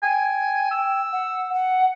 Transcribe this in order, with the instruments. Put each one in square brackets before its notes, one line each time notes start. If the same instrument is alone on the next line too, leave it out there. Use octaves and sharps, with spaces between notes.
[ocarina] G5 [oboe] G#5
[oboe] E6
[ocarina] F#5
F#5